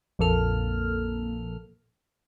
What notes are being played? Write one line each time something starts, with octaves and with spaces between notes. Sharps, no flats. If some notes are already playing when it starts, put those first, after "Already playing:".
A#1 F2 A#3 A4 F6